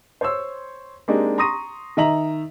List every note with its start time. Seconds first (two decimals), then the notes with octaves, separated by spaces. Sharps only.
0.21 C5 C#5 C6 E6
1.08 G#3 A#3 C4 D4 D#4 G4
1.38 A#5 C6 C#6 D#6 A#6 D#7
1.97 D#3 D#5 E5 A#5 F#7